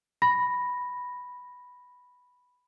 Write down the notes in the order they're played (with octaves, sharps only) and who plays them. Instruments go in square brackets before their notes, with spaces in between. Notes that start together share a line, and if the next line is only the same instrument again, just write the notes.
[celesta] B5 A#6